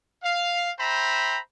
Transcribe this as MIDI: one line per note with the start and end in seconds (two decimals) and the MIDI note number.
0.23 0.70 77
0.79 1.38 72
0.79 1.38 76
0.79 1.38 79
0.79 1.38 82
0.79 1.38 83